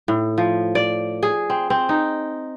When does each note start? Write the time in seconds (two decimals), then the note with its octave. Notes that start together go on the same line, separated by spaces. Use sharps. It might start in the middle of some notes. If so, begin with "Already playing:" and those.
0.08 A2
0.38 F3
0.75 D5
1.23 G#4
1.50 C4
1.70 C4
1.89 D#4